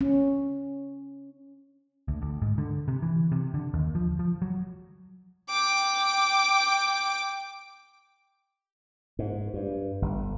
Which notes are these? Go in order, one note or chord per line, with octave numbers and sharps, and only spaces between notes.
C#4
D2
D2
G#2
D3
C3
E3
C3
D3
D#2
F3
F3
F#3
G5 D6
G#2
G2
G1